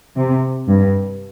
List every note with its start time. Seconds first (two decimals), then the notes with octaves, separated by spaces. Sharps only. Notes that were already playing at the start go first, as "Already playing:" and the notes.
0.16 C3
0.68 G2